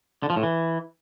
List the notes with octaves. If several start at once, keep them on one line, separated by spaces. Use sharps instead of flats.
D3
F3
A2
E3